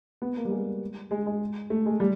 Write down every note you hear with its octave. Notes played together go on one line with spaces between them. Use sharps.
B3
A#3
G3
G#3
G#3
G#3
A3
G#3
G3